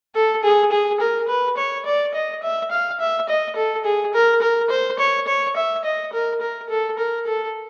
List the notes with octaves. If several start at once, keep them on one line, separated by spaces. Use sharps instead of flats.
A4
G#4
G#4
A#4
B4
C#5
D5
D#5
E5
F5
E5
D#5
A4
G#4
A#4
A#4
C5
C#5
C#5
E5
D#5
A#4
A#4
A4
A#4
A4